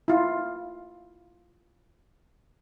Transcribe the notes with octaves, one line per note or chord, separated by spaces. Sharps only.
E4 F4